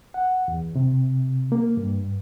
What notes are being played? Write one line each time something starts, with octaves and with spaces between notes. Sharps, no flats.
F#5
E2
C3
A#3
G2